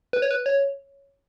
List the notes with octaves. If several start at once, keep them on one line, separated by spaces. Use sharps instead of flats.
B4
C#5
B4
C#5